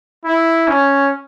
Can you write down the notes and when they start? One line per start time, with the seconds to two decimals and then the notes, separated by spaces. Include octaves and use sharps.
0.24 E4
0.67 C#4